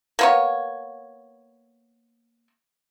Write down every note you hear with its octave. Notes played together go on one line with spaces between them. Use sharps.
A#3 B3 C#5